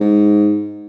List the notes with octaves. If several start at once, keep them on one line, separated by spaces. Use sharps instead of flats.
G#2